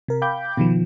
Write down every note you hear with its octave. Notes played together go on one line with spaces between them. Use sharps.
C3 A#4
F5 G5 B5 D6 G6
B2 D#3 F3